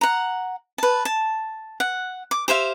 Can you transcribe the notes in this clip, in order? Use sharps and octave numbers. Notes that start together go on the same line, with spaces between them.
F#5 A#5
B4 A5
A5
F#5
D6
G4 C5 E5 F5